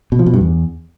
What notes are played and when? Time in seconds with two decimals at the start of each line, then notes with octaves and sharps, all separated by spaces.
0.12 B2
0.19 F3
0.26 B2
0.34 G2
0.41 E2